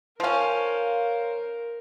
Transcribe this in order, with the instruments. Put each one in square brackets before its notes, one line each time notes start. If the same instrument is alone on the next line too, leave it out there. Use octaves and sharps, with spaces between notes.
[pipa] F3 C#4 [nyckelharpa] A#4 [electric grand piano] C5 F5